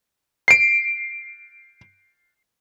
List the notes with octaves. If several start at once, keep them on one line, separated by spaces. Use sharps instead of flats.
C7 D7